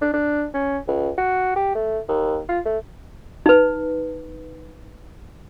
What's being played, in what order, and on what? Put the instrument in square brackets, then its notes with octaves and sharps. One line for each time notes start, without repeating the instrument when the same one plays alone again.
[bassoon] D4
D4
C#4
C#2
F#4
G4
A3
D#2
F4
A3
[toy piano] D#4 B4